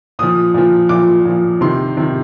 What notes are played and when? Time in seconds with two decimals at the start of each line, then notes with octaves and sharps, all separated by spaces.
0.19 A#2 F3 D#6
0.54 A#2 F3
0.89 A#2 F3 D6
1.25 A#2 F3
1.61 C3 D#3 C6
1.97 C3 D#3